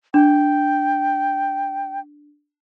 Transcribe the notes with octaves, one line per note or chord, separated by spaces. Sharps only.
D4 G5